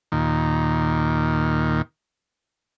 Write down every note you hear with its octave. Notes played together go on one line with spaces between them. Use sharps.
D#2 A#2 D#3